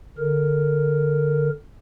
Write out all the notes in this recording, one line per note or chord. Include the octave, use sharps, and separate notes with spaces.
D3 A#4